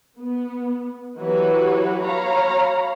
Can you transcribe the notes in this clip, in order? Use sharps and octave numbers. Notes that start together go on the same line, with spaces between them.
B3
E3 F#3 F#4 G4 B4
F#3 C#5 F5 A#5 B5